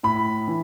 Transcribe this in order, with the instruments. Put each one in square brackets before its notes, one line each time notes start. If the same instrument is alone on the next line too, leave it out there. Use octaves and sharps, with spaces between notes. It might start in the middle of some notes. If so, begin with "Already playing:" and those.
[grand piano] A2 B5
E3